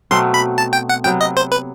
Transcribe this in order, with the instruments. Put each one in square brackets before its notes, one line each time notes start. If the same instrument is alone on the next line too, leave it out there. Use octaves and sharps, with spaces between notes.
[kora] B2 F#3 A3 C4 [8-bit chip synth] C6
[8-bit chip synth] B5
A5
G5
F#5
[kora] C3 F#3 B3 [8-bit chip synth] G5
[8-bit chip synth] D#5
C5
B4